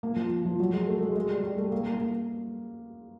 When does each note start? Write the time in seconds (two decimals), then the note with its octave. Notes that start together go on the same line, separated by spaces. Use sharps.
0.03 A#3
0.16 F3
0.45 F3
0.60 F#3
0.73 G#3
0.87 A3
1.02 G#3
1.16 G#3
1.30 G3
1.44 G3
1.58 A3
1.72 A#3
1.86 A#3
2.00 A#3